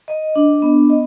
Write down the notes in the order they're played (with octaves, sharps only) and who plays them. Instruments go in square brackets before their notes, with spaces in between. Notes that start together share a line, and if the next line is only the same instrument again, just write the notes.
[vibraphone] D#5
D4
B3
D#5